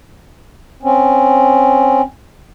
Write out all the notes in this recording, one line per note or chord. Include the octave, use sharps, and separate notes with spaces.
C4 C#4